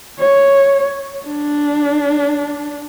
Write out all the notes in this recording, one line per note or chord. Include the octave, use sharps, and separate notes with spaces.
C#5
D4